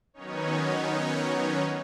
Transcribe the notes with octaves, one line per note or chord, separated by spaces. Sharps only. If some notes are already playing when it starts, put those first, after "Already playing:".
D#3 F#3 B3 C#4 D#4 C#5